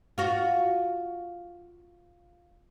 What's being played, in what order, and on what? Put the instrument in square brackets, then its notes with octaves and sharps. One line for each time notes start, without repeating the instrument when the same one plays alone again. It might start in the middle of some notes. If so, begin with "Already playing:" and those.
[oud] F4 F#4